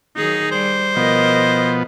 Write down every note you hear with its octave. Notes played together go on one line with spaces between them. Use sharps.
D#3 F#3 D#4 G#4
G3 C5
B2 F3 B3 A#4 D#5